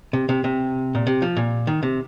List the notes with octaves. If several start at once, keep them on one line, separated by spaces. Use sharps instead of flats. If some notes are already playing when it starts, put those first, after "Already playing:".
C3
C3
C3
A#2
C3
F3
A#2
D#3
C3